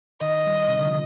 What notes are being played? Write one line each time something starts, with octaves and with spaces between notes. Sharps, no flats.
D#3 D#5
G3
C3
D3
F3